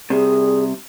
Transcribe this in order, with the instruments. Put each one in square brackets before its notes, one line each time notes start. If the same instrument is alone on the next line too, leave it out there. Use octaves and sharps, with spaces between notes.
[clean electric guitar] C2 C3 [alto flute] G#4